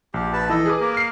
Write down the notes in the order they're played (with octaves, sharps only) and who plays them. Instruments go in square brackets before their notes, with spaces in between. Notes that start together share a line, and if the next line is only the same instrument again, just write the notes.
[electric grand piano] A#1 [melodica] G4
[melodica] B4 A5
[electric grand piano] E3 [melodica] A4 D#5
[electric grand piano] G#4 B4 D6
[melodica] A#3
[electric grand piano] F6 C7